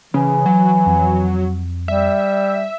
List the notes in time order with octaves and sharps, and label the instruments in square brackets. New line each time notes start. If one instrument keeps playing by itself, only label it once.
[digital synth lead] C#3 [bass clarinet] E3
[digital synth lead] F#3
[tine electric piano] F2
[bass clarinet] G3 [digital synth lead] E5